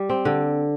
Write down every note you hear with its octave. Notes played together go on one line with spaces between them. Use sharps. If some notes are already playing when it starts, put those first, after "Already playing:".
Already playing: G3
C4
D3